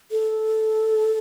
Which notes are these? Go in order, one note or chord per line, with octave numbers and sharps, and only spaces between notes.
A4